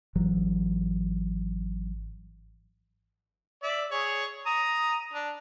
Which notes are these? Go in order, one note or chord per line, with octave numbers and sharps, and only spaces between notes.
G#1 E3 F#3
D5 E5
G#4 C#5
A#5 D#6
D4